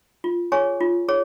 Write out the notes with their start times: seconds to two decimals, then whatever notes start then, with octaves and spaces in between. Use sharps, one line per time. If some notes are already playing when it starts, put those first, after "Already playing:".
0.24 F4
0.52 G#4 C#5 G#5 C#6
0.80 F4
1.08 G#4 C#5